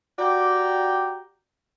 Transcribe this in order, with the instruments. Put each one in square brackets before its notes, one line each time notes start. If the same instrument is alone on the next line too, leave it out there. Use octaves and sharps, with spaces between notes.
[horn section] F#4 G4 D5 G5 A#5